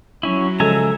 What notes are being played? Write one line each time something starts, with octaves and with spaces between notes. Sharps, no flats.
F#3 C#4 E4
C#3 F3 G#3 A4 E5 G#5 A#5